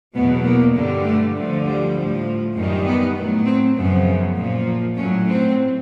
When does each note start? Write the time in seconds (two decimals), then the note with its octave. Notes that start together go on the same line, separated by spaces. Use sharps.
0.14 E2 B2 F#3 B3
0.44 A#3
0.74 G2 D3 G3
1.05 A3
1.34 D2 D3 F3
1.65 G3
1.95 A2 F3
2.55 F#2 D#3 G3 G#3
2.85 B3
3.15 A2 F#3
3.45 C4
3.75 F#2 C#3 F3 B3
4.35 A#2 F3
4.96 A2 F#3 C#4
5.25 C4